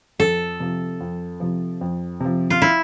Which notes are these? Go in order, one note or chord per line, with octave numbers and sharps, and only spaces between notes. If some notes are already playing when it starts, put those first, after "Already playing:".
F2 A4
C3 F3
F2
C3 F3
F2
C3 F3
F4
E4